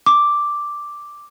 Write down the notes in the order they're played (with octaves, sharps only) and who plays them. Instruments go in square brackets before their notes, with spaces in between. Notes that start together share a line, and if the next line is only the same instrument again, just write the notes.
[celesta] D6